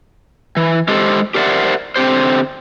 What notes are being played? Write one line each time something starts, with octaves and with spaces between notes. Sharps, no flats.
E3
G#3 G4 A4 C5
G4 A#4 C5 D5 E5 F#5
D3 C4 G4 C5